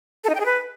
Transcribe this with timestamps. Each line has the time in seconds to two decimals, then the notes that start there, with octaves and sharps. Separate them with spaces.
0.24 A4
0.30 D#4
0.35 G5
0.40 G#4
0.45 B4